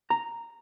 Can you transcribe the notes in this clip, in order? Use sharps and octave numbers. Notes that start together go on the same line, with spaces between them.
A#5